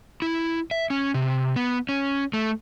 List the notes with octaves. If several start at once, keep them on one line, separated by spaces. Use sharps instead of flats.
E4
E5
C#4
C3
B3
C#4
A3